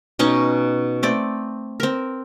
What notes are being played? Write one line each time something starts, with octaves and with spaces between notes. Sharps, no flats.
B2 C#4 D#4 C#6
A3 C4 D5
C4 A#4